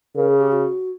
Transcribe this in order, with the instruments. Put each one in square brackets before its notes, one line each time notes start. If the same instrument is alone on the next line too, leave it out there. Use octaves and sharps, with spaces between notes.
[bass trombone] C#3 [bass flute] A#4
[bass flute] G#4
G4
F#4